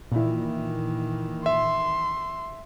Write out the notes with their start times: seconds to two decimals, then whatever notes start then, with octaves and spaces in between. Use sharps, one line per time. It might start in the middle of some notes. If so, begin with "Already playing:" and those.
0.12 A#2 D#3 E3 E4
1.46 E5 C6